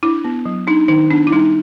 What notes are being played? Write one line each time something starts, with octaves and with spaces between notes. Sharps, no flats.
D4 E4
B3
F#3
D4 D#4
D#3 D#4
B3 D4
E4
G3 D#4